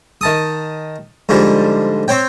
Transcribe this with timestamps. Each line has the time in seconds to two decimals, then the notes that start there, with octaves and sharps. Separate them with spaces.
0.21 D#3 A5 D#6
1.29 G#2 D3 F3 G3
2.08 C4 C5 C#5 G5